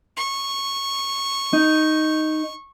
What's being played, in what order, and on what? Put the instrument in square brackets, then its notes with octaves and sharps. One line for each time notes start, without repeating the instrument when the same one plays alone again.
[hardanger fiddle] C#6
[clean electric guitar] D#4